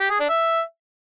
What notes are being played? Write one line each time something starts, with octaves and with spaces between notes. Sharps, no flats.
G4
G#4
D4
E5